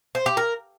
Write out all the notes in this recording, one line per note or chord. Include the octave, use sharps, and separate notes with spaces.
C5
G4
A#4